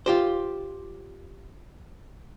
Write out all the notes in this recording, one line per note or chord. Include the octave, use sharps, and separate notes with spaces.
F4 G4 C5